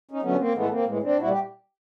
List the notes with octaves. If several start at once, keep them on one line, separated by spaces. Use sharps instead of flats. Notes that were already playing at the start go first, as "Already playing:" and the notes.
C#4 D#4
D3 F#3 A3 B3 C#4
A#3 C4
A2 E3 G#3 A3 B3
A#3 C4
A2 E3 G#3
C4 D4
A#2 G3 E4 F#4
G4